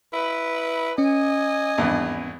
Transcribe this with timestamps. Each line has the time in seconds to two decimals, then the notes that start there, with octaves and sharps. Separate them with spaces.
0.13 E4 B4
0.98 C#4 D#5 G#5
1.78 G#1 E2 G2